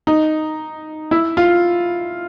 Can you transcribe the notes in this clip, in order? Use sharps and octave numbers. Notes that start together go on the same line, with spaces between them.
D#4
E4
F4